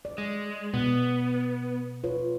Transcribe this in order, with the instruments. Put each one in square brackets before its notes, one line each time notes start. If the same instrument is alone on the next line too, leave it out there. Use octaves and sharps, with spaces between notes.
[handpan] D5
[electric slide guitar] G#3
[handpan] B2 [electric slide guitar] B3
[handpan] F4 B4 C#5